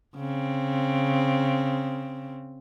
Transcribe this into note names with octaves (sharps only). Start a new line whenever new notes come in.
C#3 C4